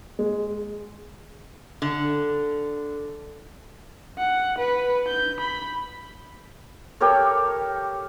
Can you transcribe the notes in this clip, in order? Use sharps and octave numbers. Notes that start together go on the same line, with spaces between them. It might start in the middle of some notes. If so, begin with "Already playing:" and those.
G#3
D3
F#5
B4
G6
B5
G4 A4 A#4 C#5